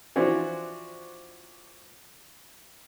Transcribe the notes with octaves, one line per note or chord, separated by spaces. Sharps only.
E3 F3 D4 F#4 C5